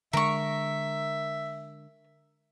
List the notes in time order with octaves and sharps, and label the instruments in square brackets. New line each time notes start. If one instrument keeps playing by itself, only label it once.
[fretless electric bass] D3 G#3 [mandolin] A#4 C#6 [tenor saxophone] E5